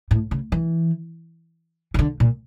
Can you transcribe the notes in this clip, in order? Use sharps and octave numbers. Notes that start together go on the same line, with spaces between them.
A2
C#3
E3
C#3
D3
A#2